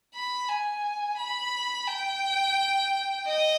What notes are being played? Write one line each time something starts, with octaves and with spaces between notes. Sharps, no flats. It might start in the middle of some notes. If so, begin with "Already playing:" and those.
B5
G#5
B5
G5
D#5